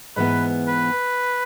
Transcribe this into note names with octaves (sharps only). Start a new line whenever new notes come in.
G#2 E3 B3 B4
B4